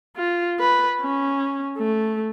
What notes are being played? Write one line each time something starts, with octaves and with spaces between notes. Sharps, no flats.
F4
B4
C#4
A3